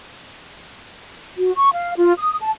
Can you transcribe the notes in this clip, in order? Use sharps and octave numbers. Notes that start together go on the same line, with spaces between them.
F#4
C#6
F5
F4
D#6
A5